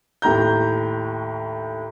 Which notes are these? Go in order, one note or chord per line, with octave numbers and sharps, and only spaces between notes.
D#2 A2 A#5 G6